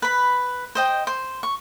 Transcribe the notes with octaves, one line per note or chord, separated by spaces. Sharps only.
B4 B5
C5 D#5 G5
C5
C#6